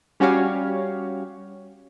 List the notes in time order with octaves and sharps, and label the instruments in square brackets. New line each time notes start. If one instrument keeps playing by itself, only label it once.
[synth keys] G3 C#4 F#4 G4 C#5 F5